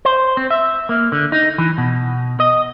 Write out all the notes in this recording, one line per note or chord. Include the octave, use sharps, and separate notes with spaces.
C5
C4
E5
A#3
D3
D#4
E3
B2
D#5